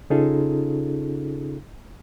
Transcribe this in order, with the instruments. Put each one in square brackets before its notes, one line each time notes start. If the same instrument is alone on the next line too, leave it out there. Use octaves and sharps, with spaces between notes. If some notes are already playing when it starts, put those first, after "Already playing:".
[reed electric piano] C#3 C#4 D#4 F4 G#4 A4